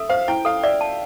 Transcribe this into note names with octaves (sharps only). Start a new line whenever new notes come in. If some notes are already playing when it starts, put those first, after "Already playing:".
Already playing: A4 E5
C5 F5
E4 G5
A4 F5
D5 E5
A5